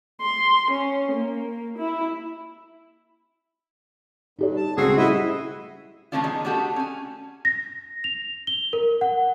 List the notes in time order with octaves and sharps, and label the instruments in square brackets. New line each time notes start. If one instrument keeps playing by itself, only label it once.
[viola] C6
C#4
A#3
E4
[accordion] G2 [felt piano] D#4 G4 D5
[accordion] A5
[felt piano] C#2 E6 C7 [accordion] C4 F#4 [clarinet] G#4
[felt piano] G3 A3 [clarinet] E4 [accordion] F#4 D#5 E5
[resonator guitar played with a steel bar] F3 G3 A3 C#4 D4 F4
D#3 B3 D#4 G#4
A3 C#4 D4 F#4 G4 A4
C#4 G#5
[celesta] A#6
F7
G7
A#4
F#5